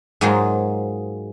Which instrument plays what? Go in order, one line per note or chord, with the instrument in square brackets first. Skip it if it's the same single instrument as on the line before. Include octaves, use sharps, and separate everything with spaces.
[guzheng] G#2 F#3 G#3 A#3 F4 C5